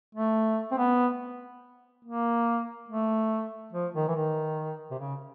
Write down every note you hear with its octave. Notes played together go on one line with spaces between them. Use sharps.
A3
C4
B3
A#3
A3
F3
D#3
E3
D#3
C3
C#3